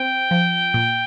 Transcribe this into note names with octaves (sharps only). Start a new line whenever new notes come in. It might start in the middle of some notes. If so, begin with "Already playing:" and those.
Already playing: C4 G5
F3
A#2